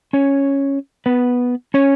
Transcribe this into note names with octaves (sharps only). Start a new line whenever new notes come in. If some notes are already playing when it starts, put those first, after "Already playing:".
C#4 C#5
B3 B4
C#4 C#5